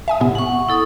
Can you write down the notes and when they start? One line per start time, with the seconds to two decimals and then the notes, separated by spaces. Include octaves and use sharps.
0.08 E5 G#5 D#6
0.20 A2 C3 B3
0.35 F#5 C#6
0.69 E4 A4 D#6